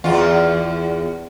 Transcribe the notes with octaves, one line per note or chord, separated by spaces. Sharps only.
E2 F4